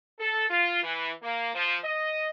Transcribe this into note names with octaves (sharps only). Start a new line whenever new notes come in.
A4
F4
E3
A#3
F3
D#5